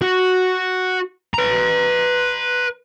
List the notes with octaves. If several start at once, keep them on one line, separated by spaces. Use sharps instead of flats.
F#4
B4 A#5